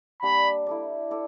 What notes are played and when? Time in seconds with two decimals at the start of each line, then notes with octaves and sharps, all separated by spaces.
0.23 G3 A#3 D4 G4 B5
0.67 E4 A4 D5
1.10 E4 A4 D5